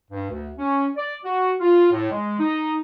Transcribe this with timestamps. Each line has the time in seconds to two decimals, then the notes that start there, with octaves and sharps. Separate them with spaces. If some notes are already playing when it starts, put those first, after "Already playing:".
0.11 G2
0.29 D2
0.57 C#4
0.96 D5
1.24 F#4
1.60 F4
1.91 A2
2.11 G#3
2.40 D#4